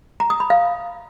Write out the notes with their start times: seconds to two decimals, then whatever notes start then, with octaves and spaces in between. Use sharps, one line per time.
0.20 A#5
0.30 D#6
0.40 B5
0.50 F5